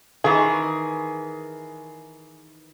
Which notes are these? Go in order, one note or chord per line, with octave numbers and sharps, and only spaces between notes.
D#3 E3 G#4